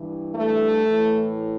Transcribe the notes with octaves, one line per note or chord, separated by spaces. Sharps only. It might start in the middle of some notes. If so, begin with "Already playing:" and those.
Already playing: G2 E3
A3
A2 E3